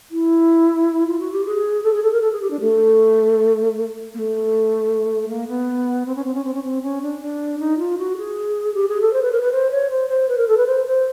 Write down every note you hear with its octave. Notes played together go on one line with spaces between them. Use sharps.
E4
F4
F#4
G4
G#4
A4
G#4
A4
A#4
A4
G#4
G4
D4
A3
A#3
A3
A#3
B3
C4
C#4
C4
C#4
C4
C#4
C4
C#4
D4
D4
D#4
F4
F#4
G#4
G4
G#4
A4
C5
B4
A#4
B4
C5
C#5
C5
C5
B4
A#4
A4
B4
C5
C5